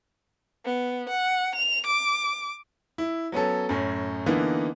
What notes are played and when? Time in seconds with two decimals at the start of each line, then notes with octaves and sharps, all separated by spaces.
0.65 B3
1.09 F#5
1.55 F7
1.87 D6
2.98 E4
3.32 F#3 B3 C#4 A4
3.69 F#2 A2 C#4
4.26 D3 E3 A#3 B3 D#4